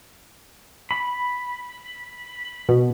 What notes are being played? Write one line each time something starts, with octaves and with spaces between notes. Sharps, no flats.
B5
B2